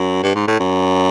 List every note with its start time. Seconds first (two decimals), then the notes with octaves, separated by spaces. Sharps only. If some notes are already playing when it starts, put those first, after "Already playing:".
Already playing: F#2
0.23 G2
0.35 G#2
0.48 A2
0.60 F#2